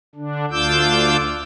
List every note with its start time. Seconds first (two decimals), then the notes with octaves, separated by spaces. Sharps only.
0.15 D3 D4
0.51 D2 D4 F4 D6 E6 G6